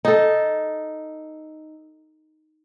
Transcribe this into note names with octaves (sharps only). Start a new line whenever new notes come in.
D#4 A4